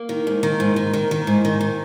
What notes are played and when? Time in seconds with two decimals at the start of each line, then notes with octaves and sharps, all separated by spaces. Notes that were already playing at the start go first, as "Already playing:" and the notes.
Already playing: A#3
0.09 D#3
0.27 G#2
0.43 D#3
0.60 G#2
0.76 D#3
0.93 D#3
1.11 D#3
1.27 G#2
1.45 D#3
1.61 D#3